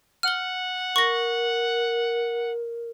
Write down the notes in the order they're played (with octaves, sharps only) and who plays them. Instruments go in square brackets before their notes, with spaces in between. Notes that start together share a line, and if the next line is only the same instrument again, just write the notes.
[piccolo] F#5 [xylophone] F6 G7
[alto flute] A#4 [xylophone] C#6 A#6